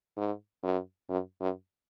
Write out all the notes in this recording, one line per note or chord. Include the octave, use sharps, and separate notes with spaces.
G#2
F#2
F#2
F#2